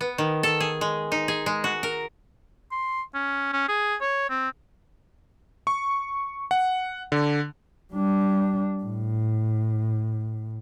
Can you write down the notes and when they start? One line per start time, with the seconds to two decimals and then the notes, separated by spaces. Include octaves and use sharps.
0.01 B3
0.18 D#3
0.43 A4
0.60 G#4
0.81 G#3
1.12 D#4
1.28 G#4
1.46 G#3
1.64 F#4
1.83 A#4
2.72 C6
3.14 C#4
3.53 C#4
3.69 G#4
4.01 C#5
4.30 C4
5.67 C#6
6.51 F#5
7.12 D3
7.93 G3 D4
8.84 A2